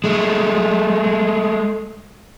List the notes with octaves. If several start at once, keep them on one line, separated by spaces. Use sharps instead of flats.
G#3 A3